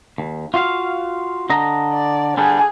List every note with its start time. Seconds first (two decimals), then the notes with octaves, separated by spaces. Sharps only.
0.18 D#2
0.54 F4 F#4 F5
1.50 D3 D#5 A#5
1.92 D5
2.37 D3 G3 B3 G#4